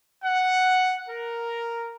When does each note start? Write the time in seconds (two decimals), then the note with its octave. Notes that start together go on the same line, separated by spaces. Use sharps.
0.23 F#5
1.08 A#4